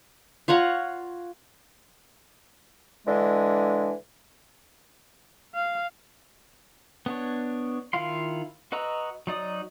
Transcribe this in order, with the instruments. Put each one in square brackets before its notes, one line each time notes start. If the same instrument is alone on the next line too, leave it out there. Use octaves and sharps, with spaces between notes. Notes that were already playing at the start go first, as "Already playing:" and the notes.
[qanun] F4 C#5 F#5 A#5
[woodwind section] D3 E3 G#3 D4
[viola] F5
[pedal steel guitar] B3 D4 C#5
D#3 E4 F4 F5 C6
F#4 B4 D#5 A#5 E6
F#3 D#4 D5 D#6